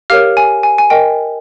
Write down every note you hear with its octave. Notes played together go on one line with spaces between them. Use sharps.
G4 A#4 C#5 F5 F6
G#5
G#5
G#5
A#4 D#5 G5